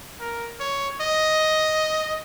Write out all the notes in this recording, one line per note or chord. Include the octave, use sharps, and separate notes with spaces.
A#4
C#5
D#5